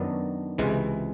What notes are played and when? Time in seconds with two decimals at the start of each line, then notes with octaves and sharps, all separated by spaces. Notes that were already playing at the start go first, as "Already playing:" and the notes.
Already playing: F#2 D#3 F#3 B3 D4 A5
0.58 C#2 C3 E3 G#3